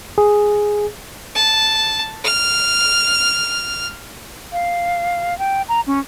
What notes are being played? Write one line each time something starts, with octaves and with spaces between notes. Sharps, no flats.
G#4
A5
F6
F5
G5
A#5
C#4